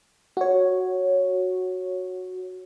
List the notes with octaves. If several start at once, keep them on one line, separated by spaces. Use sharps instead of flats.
F#4 C#5